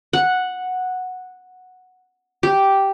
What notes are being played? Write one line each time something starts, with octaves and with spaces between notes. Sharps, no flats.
F#5
G4